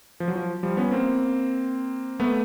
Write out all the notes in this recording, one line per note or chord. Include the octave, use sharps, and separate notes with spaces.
F3
F#3
F3
F3 G3
B3 C#4
A#3 C4
A3 B3